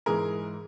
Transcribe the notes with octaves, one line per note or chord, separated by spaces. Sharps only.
G#2 E3 G#3 G#4 A#4